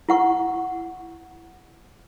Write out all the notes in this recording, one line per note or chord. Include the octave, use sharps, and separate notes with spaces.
E4 F#5 C#6